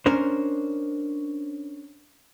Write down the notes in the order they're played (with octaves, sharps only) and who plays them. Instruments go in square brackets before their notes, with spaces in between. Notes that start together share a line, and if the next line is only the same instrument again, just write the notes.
[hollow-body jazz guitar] C#4 D4 A#4 C5